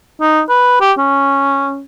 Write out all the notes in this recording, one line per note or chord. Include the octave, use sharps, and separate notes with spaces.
D#4
B4
G4
C#4